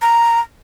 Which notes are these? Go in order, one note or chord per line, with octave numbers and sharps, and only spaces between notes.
A#5